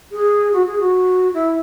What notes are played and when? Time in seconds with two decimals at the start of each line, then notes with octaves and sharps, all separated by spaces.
0.12 G#4
0.53 F#4
0.66 G#4
0.80 F#4
1.34 E4